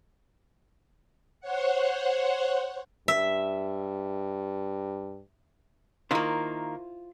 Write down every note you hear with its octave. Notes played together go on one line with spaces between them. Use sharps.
C5 C#5 F#5
G2 E5
D#3 A#3 E4 F4 C5